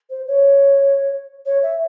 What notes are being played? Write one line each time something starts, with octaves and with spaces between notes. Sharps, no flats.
C5
C#5
C#5
E5